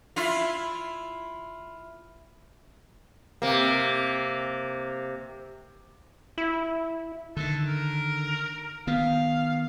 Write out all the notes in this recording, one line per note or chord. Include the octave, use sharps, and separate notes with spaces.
E4 F4
C3 A#3
E4
D3 D#3 A4
A#4
D#3 B3 F5